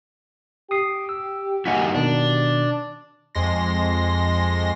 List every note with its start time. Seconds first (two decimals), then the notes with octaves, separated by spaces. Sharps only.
0.71 G4 D#6 C7
1.09 E6
1.66 A#3 D#4 F#4 F#5 G#5 B6
1.94 B2 D#3 D4
3.35 F2 G#3 C6 A#6